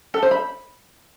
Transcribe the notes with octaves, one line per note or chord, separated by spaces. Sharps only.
A4
C5
B5